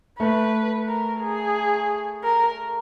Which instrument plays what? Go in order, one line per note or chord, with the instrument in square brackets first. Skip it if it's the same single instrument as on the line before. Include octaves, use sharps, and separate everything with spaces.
[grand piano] A3 [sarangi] B4
[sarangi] A#4
G#4
A#4